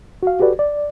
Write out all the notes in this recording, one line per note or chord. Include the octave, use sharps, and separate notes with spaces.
F#4 F5
F#4 G4 A4 B4 D5
D5